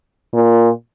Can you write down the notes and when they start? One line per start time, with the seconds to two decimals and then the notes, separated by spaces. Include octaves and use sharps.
0.34 A#2